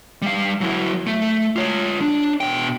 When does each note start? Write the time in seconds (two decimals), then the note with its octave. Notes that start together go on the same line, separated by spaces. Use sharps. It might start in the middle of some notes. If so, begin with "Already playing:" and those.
0.22 G3 F5
0.61 F#3 E4
1.07 A3
1.56 F4 C#5
2.01 D4
2.41 B2 G5